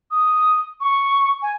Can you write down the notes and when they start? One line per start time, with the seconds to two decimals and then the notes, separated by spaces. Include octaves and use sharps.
0.11 D#6
0.80 C#6
1.42 G#5